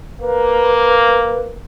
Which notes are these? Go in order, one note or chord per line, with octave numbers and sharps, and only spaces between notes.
A#3 B4